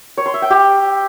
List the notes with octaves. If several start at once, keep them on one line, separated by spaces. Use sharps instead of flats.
C#5
C6
E5
G5
G4